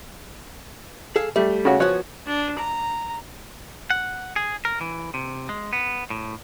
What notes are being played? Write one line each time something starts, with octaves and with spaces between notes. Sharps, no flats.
G#4 A4 F5
G3 A3
C#3 F#4 C#5
F3 B3 F#4 C#5 F#6
D4
A#5
F#5
G#4
A#4
E3
C3
G#3
B3
A2